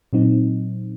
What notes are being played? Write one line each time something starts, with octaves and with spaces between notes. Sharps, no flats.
A#2 F#3 C4 D#4